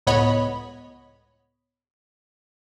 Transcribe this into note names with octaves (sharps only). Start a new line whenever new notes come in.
C#2 A2 B3 C#5 D#5 B5